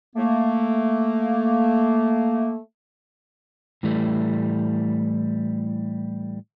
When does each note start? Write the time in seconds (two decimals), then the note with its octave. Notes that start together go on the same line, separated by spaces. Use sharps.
0.16 A3 A#3
3.83 A2 E3 G3 A3